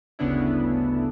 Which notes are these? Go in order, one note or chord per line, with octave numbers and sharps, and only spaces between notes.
G1 D2 C#3 B3 D4 E4